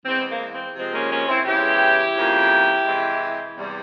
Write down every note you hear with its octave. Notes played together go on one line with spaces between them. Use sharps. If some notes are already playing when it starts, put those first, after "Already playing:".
E2 E3 G#3 C4
A#3
C4
C3 F3 G#3 C4
A#3 C#4
A#3 C#4
C4 E4
E2 C#3 E3 G#3 E4 G4
F2 C#3 F3 A#3
C3 E3 G#3
E2 C3 E3 G3